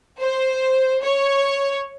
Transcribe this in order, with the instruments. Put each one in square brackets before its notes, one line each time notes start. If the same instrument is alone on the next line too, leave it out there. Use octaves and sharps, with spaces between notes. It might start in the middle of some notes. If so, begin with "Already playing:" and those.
[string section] C5
C#5